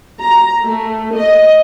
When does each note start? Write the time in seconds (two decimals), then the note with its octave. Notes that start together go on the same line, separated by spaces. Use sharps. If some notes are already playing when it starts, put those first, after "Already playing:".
0.21 A#5
0.63 A3
1.16 D#5